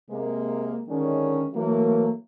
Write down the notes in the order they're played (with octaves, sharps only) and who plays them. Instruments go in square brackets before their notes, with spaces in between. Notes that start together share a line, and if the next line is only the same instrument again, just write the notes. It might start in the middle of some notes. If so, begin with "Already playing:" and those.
[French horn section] C3 G#3 A#3
D3 D#3 G#3 C#4
E3 F#3 A3 A#3